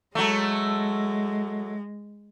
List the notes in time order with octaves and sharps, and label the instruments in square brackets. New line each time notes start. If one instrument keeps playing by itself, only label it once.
[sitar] F#3 A3 [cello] G#3